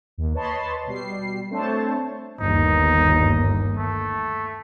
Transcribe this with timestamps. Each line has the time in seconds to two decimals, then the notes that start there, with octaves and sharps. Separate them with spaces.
0.18 D#2
0.34 B4 C#5 D#5 A5 B5 C6
0.87 B2 G3 C7
1.50 A3 C4 D4 C5 C#5 A5
2.41 G1 D#2 D#4
3.77 A3